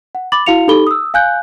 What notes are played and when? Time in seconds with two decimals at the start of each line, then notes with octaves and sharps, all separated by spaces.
0.15 F#5
0.32 B5 D6 A6 F#7
0.46 E4 F#4 F5 C#7 F7
0.68 D#4 G4 A4 B5 G7
0.87 D#6 E6
1.14 F5 G#5 F#6 G6